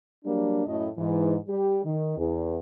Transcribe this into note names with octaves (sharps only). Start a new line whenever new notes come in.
F#3 G3 A#3 D4
F#2 A2 D#5
G#2 E3
G3 G4
D#3
E2